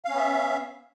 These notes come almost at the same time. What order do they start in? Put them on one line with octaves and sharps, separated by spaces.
F5 C#4 B3 E5